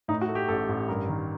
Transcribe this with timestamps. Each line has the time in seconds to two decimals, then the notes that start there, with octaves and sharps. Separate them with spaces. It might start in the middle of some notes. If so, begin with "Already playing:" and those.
0.08 A2 D#4
0.21 F#4
0.28 A3
0.35 G4
0.48 A1 A4
0.69 A1
0.88 G2 A#4
1.09 D#3